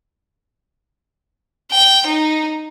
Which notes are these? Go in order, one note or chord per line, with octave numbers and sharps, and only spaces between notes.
G5
D#4